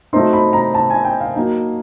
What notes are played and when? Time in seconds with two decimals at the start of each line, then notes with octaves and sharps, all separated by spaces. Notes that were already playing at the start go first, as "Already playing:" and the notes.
0.13 F#3 A3 C4 D#4 C6
0.33 B5
0.53 A#5
0.74 A5
0.90 G#5
1.05 G5
1.21 F5
1.35 F#3 A#3 D#4